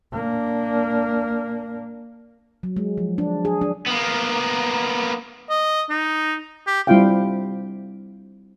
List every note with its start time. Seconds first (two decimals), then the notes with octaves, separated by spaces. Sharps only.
0.13 A#3 D4
2.63 F#3
2.77 G#3
2.98 F3
3.18 D4
3.45 G#4
3.61 D4
3.86 A#3 B3
5.50 D#5
5.90 D#4
6.67 G4
6.87 G3 C4 E4 F4 F5 G5